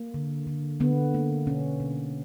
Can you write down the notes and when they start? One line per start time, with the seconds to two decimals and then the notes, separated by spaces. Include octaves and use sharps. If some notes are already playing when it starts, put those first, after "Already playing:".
Already playing: A#3
0.14 D3
0.47 D3
0.80 D3 B3
1.14 A#3
1.47 B2 C#4
1.80 B2